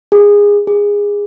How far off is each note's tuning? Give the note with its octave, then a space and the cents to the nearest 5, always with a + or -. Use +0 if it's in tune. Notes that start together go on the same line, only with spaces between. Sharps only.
G#4 -20
G#4 -20